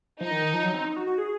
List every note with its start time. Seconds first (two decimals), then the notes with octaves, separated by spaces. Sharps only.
0.21 F3 D#4
0.31 D#3
0.42 D#3
0.53 F3
0.63 F#3
0.74 C4
0.85 D#4
0.96 F#4
1.07 F#4
1.18 G#4